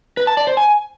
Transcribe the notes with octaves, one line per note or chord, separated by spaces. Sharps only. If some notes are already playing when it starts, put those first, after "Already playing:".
B4
A5
D5
C5
G#5